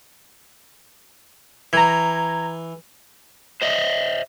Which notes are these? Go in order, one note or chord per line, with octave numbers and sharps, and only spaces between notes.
E3 A#5 G#6
C5 D#5 E5